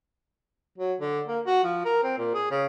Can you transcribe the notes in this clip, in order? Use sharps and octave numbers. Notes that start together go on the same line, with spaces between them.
F#3
D3
A#3
F#4
F3
A#4
C4
A#2
G#4
C#3